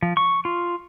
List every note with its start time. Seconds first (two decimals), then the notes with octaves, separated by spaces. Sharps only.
0.02 F3
0.17 C#6
0.45 F4